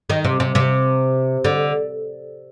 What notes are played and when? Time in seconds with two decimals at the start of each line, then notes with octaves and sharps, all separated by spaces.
0.10 D#3
0.24 C3
0.40 C3
0.55 C3
1.44 D3